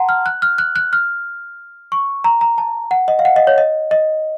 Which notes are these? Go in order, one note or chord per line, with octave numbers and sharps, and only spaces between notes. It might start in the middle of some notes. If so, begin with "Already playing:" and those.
Already playing: F#5 A5 A#5 C6
F6
F#6
F6
F#6
F#6
F6
C#6
A#5
A#5
A5
F#5
D#5
F5
F#5
D#5
C#5
D#5
D#5